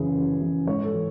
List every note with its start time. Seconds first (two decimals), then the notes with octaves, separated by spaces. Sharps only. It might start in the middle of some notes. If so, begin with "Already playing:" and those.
Already playing: F#2 C#3 E3 G#4
0.15 F#2
0.41 C#3 E3
0.67 G#2 C#5
0.84 A4
0.94 E3